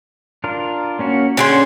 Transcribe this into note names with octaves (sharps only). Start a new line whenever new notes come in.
D4 F4 A#4
A#3 C#4 F#4
D3 C#4 G#4 C5